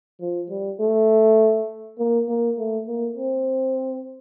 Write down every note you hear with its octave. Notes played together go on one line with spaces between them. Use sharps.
F3
G3
A3
A#3
A#3
A3
A#3
C4